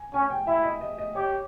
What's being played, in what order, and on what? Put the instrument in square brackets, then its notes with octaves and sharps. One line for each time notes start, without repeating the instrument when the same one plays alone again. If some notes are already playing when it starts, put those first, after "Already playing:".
Already playing: [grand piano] G#5
[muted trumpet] C#4 [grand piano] G#5
[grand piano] G5
[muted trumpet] E4 [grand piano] E5
[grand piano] D#5
D#5
D#5
[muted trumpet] G4 [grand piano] C#5